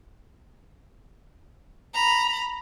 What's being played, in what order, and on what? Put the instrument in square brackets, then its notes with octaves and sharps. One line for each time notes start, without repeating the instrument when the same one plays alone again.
[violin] A#5 B5